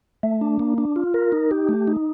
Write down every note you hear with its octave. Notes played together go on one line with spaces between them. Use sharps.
A3
D4
A#3
D4
F4
A#4
D#4
G4
A3
D#4